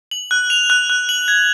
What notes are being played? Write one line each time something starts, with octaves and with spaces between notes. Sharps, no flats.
F#7
F#6
F7
F#6
F#6
F#7
G#6